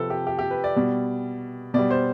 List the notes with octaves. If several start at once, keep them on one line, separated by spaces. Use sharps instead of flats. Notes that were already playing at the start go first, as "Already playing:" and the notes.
Already playing: C3 F3 A4 B4
G4
G4
G4
B4
D5
B2 G3
B2 G3 D5
C5